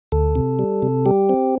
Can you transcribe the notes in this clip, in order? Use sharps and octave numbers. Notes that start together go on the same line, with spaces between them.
D2 A4
C3
G3
C3
G3 G4
C4